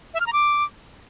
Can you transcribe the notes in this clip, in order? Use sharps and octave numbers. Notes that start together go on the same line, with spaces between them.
E5
F6
A#5
D6